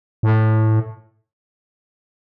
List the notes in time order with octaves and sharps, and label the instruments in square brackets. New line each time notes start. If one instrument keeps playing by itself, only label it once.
[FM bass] A2